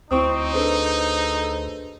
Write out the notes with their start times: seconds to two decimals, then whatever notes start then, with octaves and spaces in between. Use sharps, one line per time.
0.11 D2 C4 D#4 E4 C#6 D#6
0.53 D4 G#4 A4 B4 C5